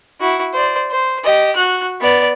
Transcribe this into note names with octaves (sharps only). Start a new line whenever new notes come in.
E4 F#4
C5 D5
C5
G4 D#5
F#4 F#6
B3 D5